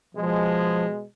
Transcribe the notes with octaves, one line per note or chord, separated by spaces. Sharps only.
B2 F3 G#3